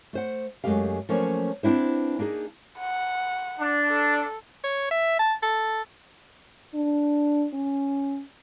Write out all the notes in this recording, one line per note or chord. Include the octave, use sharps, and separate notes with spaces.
A3 C5 F#5
F#2 C3 G#3 A3 G4 F5
F3 F#3 A3 A#3 C#4 C#5
B3 C4 D4 E4 C5
A#3 D4 D#4 G#4
F#5
D4
A4
C#5
E5
A5
A4
D4
C#4